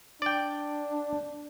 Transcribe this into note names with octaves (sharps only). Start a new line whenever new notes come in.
D4 D5 G5